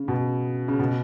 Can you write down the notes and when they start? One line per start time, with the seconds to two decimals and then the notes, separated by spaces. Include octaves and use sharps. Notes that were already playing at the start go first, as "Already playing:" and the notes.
Already playing: C#3
0.08 B2
0.68 C#3
0.79 B2